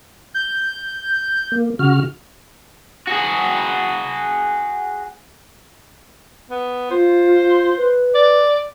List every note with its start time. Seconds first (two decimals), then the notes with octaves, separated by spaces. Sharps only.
0.34 G6
1.52 A#3
1.79 C#3 F#4 F6
3.08 F#4 G#4
6.50 B3
6.91 F4 C5
7.77 B4
8.15 D5